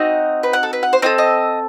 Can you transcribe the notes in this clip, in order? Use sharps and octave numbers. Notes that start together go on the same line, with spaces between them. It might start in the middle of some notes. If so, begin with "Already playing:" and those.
Already playing: C4 D#4 F#4 D#5
B4
F#5
A4
B4
F#5
C5
C4 F#4 A4 D#5
D#5